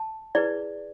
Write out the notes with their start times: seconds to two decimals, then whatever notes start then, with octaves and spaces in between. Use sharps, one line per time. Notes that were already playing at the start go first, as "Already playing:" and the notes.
Already playing: A5
0.35 E4 G#4 B4 D5